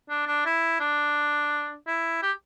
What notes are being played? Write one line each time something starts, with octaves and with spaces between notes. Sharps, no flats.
D4
D4
E4
D4
E4
G4